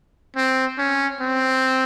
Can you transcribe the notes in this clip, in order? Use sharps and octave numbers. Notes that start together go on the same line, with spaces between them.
C4
C#4
C4